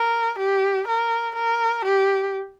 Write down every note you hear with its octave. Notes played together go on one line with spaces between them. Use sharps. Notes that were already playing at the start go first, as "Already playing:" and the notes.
Already playing: A#4
G4
A#4
A#4
G4